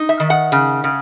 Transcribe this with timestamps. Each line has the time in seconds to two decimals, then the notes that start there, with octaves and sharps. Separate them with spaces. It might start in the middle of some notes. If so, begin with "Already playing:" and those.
Already playing: D#4
0.09 E5
0.20 D#3
0.30 F#5
0.52 C#3
0.84 C#3